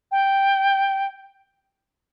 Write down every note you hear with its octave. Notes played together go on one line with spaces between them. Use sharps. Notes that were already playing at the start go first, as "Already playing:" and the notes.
G5